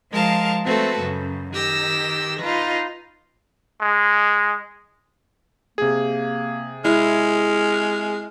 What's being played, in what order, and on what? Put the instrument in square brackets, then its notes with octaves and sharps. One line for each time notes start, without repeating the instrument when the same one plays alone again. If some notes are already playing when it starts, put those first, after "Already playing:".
[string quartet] F3 G#3 A#4 F5 A5
A3 C4 F#4 A4 B4
F#2 C#3
D#3 G4 E6 A#6
D#4 F4 B4
[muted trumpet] G#3
[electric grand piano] C3 G#4 [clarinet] A#3
[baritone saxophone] G#3 [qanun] E4 [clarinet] F6